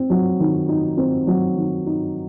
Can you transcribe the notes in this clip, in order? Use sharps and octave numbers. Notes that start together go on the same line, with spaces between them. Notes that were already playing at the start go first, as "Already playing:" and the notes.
Already playing: C4
F#3
D#3
D#4
C4
F#3
D#3
D#4